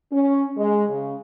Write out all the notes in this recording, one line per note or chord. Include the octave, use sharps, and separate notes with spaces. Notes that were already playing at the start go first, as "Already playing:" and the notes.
C#4
G#3
C#3